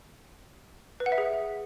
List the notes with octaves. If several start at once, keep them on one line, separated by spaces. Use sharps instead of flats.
B4
F#5
E5
G#4